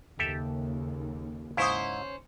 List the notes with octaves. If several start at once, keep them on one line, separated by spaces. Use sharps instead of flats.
D#2 C#3 G4 A4 E5
G#2 C#4 E4 C5 F5 C#6 D#6